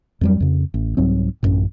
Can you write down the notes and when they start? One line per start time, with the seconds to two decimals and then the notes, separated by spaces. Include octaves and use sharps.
0.21 F2 F#3 G3
0.40 F2 C#3
0.74 A1
0.97 C2 G#2 F#3 C4
1.43 A1 F#2 A#2